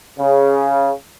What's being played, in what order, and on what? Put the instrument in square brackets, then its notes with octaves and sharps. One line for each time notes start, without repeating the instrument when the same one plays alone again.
[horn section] C#3